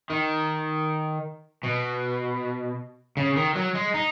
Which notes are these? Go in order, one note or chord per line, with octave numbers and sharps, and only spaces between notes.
D#3
B2
C#3
D#3
F#3
G#3
D#4